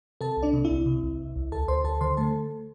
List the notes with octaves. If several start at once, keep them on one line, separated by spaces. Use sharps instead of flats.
C3 A4 A5
C2
D4 D5
C3
E4 E5
C2
C3
C2
C2
C2
D2 A4 A5
D2 C5 C6
D2 A4 A5
D3 C5 C6
A3 A4 A5